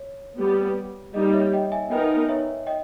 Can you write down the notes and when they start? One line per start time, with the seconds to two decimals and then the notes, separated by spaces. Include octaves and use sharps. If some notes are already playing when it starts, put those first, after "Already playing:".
Already playing: C#5
0.38 G3 B3 G4
1.14 G3 A#3 D#4 G4 D#5
1.33 C#5 E5
1.53 D#5 G5
1.72 E5 G#5
1.91 B3 D#4 A#4 D#5 G5
2.28 C#5 E5
2.67 D#5 G5